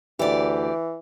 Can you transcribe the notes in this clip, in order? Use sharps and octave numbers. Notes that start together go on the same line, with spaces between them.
D2 E3 G4 D5